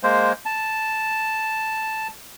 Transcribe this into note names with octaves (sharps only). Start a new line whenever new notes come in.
G#3 A#3 C5
A5